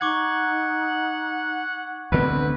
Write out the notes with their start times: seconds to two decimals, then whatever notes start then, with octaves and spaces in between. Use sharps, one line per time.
0.01 D#4 F#5 C#6 D6 G#6
2.12 D2 D3 B3 C4 B4